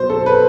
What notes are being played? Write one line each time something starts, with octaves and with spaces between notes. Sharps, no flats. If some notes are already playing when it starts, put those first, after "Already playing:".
Already playing: B2 F#3 C5
A4
B4